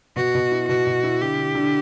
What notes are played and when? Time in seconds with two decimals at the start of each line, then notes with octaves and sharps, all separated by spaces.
0.16 B2 F#4
0.35 B2
0.52 E4
0.68 B2 F#4
0.87 B2
1.04 E4
1.21 D3 G4
1.38 D3
1.55 D3